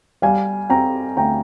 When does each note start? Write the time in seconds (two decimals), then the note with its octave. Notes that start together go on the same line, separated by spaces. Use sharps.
0.22 G3 F5 G#5
0.70 C4 G5 A#5
1.17 D2 G5 A#5